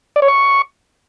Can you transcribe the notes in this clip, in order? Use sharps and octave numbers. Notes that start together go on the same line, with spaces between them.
D5
C#5
C#6